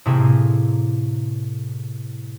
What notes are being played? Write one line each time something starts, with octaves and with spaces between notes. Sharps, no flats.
A2 C3 A#3 C4 G#4